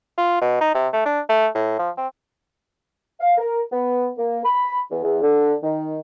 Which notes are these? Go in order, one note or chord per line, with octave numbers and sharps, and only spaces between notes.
F4
B2
D#4
C3
A3
D4
A3
A2
F3
C4
F5
A#4
B3
A#3
B5
E2
E2
D3
D#3